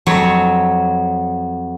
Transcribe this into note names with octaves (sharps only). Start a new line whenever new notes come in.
F2 F#3 C#5